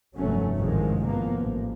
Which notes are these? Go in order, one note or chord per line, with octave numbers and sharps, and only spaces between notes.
F1 G2 F#3 A3 C#4
A1 G#2 C3 D#3 F3 G#3
F3 A#3 B3
A1